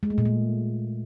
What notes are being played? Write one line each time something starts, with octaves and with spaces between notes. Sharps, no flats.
G#3
A3
A#2
A3